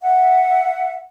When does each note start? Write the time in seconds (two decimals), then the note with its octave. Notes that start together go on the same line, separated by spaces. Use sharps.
0.02 E5 F#5